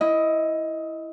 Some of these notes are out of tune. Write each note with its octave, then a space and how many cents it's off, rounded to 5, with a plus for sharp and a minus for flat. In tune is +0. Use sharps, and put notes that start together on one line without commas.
E4 +0 D#5 +15